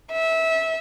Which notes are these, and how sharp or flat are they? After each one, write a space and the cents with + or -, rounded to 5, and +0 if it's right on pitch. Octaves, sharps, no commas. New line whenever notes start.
E5 -20